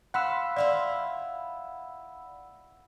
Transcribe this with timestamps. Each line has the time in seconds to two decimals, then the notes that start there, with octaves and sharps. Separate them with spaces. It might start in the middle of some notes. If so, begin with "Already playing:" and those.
0.14 F4 F#5 B5 E6
0.56 E4 F4 D5 E5